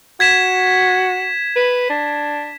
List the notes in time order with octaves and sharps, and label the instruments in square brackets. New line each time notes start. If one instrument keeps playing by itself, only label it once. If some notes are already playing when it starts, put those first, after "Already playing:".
[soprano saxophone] F#4 [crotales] G#6 B6 E7
[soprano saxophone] B4
D4